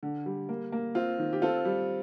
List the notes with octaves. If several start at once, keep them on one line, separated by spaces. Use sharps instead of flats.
D3
G3
A#3
A#3
C4 F4
D#3
G4
C4 F4 A4
G3